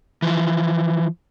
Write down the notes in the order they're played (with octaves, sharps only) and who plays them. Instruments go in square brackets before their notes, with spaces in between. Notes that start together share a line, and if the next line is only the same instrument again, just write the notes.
[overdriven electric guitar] E3 F3